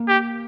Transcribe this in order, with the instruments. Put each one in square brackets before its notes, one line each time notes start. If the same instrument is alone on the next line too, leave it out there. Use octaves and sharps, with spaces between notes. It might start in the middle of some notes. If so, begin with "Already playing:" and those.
Already playing: [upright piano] A#3
[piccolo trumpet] G4